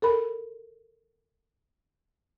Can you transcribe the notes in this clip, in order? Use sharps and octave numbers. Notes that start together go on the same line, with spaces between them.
A4 A#4 B5